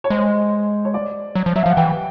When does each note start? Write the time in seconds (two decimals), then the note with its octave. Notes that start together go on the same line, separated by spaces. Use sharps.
0.04 C#5
0.10 G#3 C5
0.85 C#5
0.94 D5
1.35 F#3
1.46 F3
1.56 F#3 E5
1.63 F5
1.66 F3
1.70 F#5
1.77 E3 G5